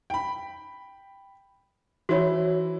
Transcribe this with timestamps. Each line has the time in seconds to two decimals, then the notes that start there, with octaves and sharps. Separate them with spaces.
0.10 G5 B5
2.09 E3 E4 F#4 C5 C#5